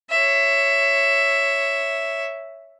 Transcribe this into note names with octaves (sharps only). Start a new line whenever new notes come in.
C#5 E5